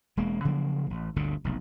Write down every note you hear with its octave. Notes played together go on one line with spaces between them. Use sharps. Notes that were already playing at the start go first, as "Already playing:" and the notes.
E1 G#3 A#3
C#3 F3 F#3 A#3
A1
G1 D2 A#2 D3
F1 B1